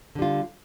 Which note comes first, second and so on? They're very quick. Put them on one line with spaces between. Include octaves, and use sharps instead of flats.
D3 G3 F4